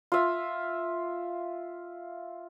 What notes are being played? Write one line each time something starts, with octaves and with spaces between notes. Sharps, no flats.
F4 E5